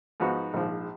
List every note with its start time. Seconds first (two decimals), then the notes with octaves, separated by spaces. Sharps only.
0.20 G#2 F3 B3 D#4 F#4
0.54 A#1 G#2 F3